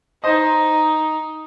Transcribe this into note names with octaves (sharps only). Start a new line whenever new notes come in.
D#4 C5 D#5